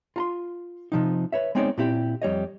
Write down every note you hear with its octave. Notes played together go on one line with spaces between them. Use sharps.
F4 A#5 C6
C3 F3 D#4
B4 C#5 E5
G#3 B3 C4 D#4 C#5 D5
A#2 C4 E4 G4
F2 G3 C#5 D#5